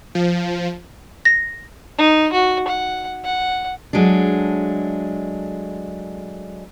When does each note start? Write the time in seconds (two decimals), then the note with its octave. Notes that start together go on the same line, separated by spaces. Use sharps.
0.15 F3
1.25 A#6
1.98 D#4
2.33 F#4
2.68 F#5
3.25 F#5
3.93 F#3 G#3 A3 D4